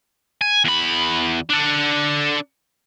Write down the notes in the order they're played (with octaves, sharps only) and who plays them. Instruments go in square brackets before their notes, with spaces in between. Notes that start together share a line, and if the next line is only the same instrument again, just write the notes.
[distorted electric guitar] G#5
E2 B5
D4 A4